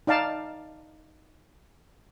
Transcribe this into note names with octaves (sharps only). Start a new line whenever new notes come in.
D#4 D5 F5 A5